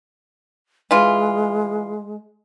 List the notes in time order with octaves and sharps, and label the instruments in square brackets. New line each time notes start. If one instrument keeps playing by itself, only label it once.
[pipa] E3 F4 [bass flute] G#3